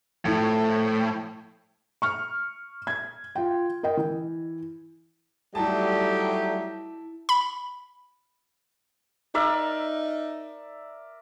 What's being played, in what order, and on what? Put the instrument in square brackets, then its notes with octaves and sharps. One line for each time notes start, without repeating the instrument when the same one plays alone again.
[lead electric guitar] A2 [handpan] F3 E4 [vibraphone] A4
[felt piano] C#6 F6
G#6
F4 G5
A#4 D#5 G5
E3
[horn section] F#3 D#4 G4 [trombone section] G3 A3 [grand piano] E4 A5
[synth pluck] B5
[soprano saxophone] D#4 [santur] A#4 D5 E5